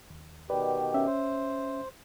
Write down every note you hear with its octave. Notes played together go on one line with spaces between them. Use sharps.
D#2
B2 D#3 G4 B4 D5
C#4 E5
C5